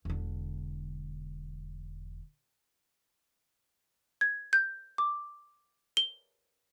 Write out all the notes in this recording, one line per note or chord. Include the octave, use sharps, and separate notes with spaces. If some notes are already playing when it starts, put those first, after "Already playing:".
E1 D3
G#6
G6
D6
G7